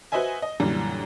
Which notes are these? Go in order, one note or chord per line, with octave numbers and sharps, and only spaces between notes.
F#4 B4 C5 D#5 E5 G#5
D#5
F#2 A#2 D3 E3 G3